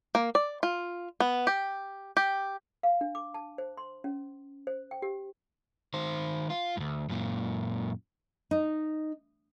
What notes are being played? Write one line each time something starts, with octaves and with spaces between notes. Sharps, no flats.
A#3
D5
F4
B3
G4
G4
F5
D4
D6
A5
C5
C6
C#4
C5
G5
G4
D#3 C5
F4
D2 G2
F#2 A#2
D#4